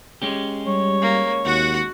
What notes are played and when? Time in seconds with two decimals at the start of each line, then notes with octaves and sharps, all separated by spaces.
0.22 G#3 C#4 G4
0.67 G3 C#5
1.02 A#3
1.45 D#2 F#4 F#5